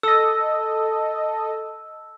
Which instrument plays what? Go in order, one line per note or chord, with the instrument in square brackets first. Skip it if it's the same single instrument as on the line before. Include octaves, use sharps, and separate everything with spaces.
[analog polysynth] A4 D#5 [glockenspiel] E6